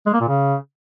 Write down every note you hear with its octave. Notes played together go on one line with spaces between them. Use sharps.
G#3
A#3
A#2
C#3